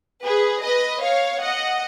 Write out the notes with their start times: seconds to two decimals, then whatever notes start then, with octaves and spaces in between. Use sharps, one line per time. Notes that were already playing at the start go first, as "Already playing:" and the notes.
0.24 G#4 B4
0.63 B4 D#5
1.02 C#5 F5
1.40 D#5 F#5